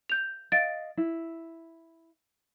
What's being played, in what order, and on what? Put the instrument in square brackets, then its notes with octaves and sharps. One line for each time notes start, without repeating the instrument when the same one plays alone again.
[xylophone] G6 F7
[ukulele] D#5 F5 [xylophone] A6 D7
[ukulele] E4